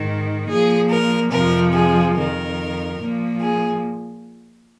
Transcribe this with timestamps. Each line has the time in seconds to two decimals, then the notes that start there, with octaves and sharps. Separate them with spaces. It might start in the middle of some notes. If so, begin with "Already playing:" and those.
Already playing: G#2 D#3
0.47 A#2 F3 G#4
0.89 A#4
1.31 F2 C3 F3 A#4
1.72 G#4
2.14 F2 D#3 A#4
2.99 A#2 F3
3.40 G#4